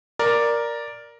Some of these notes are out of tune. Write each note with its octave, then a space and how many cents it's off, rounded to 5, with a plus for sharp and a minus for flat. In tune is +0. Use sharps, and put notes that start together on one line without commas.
A#4 +5 D5 +0